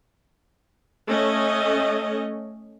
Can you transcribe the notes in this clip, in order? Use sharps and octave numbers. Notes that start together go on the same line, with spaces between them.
A3 C#4 D#5